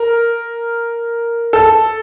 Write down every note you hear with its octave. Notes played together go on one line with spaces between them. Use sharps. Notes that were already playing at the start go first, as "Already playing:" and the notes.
Already playing: A#4
A4